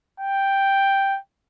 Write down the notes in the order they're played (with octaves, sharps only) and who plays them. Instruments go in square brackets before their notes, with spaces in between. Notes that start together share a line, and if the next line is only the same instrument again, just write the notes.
[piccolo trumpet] G5